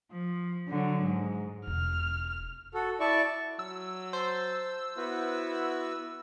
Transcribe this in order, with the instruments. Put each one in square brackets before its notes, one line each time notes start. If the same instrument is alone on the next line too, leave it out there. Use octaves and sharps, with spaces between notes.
[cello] F3
D3 F#3
G#2
[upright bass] E1 [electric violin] F6
[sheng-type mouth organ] F#4 A4
E4 D5 A5 C#6
[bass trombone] F#3 [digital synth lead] E6
[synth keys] C5 [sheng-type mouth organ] A5
[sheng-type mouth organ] B3 F#4 B4 [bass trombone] E4